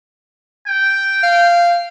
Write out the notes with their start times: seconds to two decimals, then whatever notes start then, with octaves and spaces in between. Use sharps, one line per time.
0.67 G5
1.23 F5